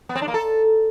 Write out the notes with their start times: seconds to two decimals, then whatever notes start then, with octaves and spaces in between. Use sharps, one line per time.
0.09 B3
0.15 C4
0.22 D4
0.28 A#3
0.34 A4